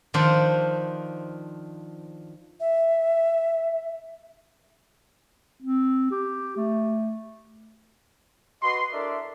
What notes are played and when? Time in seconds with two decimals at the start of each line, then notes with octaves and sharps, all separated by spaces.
0.14 D#3 F3 D4 C5
2.60 E5
5.63 C4
6.11 G4
6.57 A3
8.62 F#4 B4 D#5 C6
8.93 D4 E4 A4 A#4 D5 E5